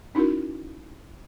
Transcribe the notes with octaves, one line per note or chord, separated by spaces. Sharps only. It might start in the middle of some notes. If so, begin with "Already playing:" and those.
C#4 D#4 E4 F#4 A#4